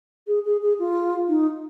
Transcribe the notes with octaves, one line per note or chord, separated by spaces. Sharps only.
G#4
G#4
G#4
F4
D#4